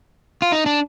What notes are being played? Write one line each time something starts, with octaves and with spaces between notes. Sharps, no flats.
F4
D#4
D4